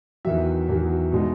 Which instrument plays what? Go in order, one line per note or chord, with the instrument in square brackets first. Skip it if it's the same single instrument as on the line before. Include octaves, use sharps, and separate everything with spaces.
[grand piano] E2 D#3 F#3 E5
E2 D#3 F#3
B2 G#3 D#4